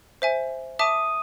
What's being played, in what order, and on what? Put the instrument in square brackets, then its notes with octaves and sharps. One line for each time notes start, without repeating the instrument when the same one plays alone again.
[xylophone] C5 E5 G#5
[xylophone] E5 A5 D6 [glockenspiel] D#6 D#7